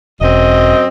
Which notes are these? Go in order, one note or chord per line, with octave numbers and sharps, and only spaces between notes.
E1 F#2 C4 D#5